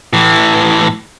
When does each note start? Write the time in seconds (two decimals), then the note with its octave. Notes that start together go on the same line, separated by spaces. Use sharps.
0.13 A2 E3